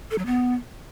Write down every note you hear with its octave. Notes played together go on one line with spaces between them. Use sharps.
A4
F#3
B3